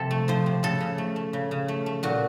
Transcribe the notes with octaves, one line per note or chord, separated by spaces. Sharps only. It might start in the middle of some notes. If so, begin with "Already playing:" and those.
Already playing: C3 F3 A4
A3
F3 C5
C3
C#3 A4
C#3
A3
A3
C#3
C#3
A3
A3
A#2 F#4